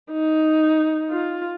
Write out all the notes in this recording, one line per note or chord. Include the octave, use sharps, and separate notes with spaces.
D#4
F4